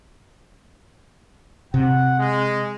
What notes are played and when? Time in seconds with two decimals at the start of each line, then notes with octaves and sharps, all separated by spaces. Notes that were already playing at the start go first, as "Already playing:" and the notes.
1.74 C3 F#5
2.18 G#3